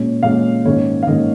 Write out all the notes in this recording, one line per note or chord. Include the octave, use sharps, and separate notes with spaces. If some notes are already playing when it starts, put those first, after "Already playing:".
Already playing: A#2 G#3 C#4
A#2 G#3 C#4 F5
G#2 D#3 A#3 C#4 C#5
F5
G#2 D#3 A#3 C#4 D#5